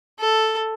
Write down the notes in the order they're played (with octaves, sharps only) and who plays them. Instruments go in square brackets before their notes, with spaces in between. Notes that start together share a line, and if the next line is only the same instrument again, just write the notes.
[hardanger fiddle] A4